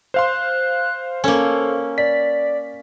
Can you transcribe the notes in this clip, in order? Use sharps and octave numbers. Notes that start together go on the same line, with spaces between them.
C5 F5 C6 F#6
A#3 C#4 A4
D5 B6